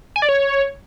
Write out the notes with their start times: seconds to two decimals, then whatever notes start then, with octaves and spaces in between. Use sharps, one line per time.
0.16 G#5
0.22 D5
0.29 C#5